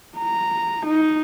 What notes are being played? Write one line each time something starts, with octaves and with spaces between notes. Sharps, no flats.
A#5
D#4